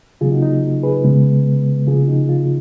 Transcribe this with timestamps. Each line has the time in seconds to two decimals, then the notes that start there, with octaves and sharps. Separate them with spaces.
0.21 C#3 F#3 A#3 F4 G#4
0.31 D#4 F#4
0.42 D#4
0.83 G#4 B4
1.04 C#3 G#3 B3
1.87 C#3 F3 A#3 F4 G#4
2.08 D#4 F#4
2.29 F4